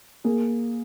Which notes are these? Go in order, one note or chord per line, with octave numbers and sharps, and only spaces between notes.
A#3 G#4